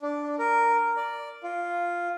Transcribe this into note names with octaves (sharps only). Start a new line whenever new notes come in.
D4
A#4
D5
F4